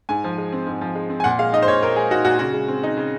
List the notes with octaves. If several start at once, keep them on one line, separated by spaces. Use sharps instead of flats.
G#2 G#5
F3
G#3
C4
G#2
F3
G#3
C4
G#5
A#2 F#5
G#3 F5
D#4 D#5
C5
A#2 C#5
A#2 A#4
G#3 G#4
D#4 F#4
A#2 F#4
C#3 F#4
G#3
C4
D#4
C#3